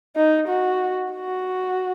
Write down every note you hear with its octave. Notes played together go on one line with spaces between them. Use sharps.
D#4
F#4
F#4